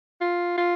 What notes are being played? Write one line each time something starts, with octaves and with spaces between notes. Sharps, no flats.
F4
F4